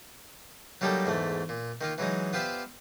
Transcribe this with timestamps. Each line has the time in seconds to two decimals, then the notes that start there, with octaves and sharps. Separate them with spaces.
0.81 F#3 G3 A#3 D#4 G4 A4
1.06 E2 G#2 A3
1.49 A#2
1.81 D#3 A#3 F4
1.98 E3 F#3 G#3 D#4
2.33 B3 F4 G4 C5 D5 E5